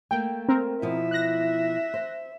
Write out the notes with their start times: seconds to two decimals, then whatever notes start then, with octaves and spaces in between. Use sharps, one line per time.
0.11 A3 A#3 G5
0.48 C4 A#4
0.82 B2 F3 E4 E5
1.11 F#6 A#6
1.94 C5